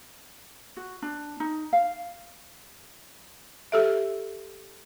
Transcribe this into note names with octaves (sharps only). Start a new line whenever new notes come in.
F#4
D4
D#4
F5
G4 A4 E5